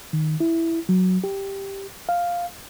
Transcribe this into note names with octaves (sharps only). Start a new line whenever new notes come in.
D#3
E4
F#3
G4
F5